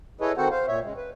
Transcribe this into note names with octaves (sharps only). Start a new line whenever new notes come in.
E4 G#4 A4 B4 C#5 D#5
D#3 C4 F#4 A4 C5 F#5
C5 F5
A#2 C#5 E5
C#3 G#3
B4